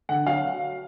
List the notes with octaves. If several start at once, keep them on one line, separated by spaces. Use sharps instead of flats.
D3 F#5
F#3 F5